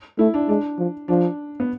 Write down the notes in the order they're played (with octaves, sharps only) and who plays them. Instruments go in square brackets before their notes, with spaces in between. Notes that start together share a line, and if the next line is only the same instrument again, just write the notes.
[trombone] A3 [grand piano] E4
[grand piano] D4
[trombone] G#3 [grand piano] D4
[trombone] F3
[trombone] F3 [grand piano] D4
[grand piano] B3